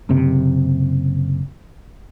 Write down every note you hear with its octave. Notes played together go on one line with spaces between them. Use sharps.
F#1 C3